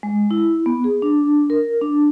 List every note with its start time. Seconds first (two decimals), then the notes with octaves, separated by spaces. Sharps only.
0.03 G#3
0.31 E4
0.66 B3
0.84 G#4
1.02 D4
1.50 A#4
1.81 D4